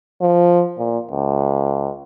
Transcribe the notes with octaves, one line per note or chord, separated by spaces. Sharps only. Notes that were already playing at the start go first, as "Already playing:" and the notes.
F3
A#2
C#2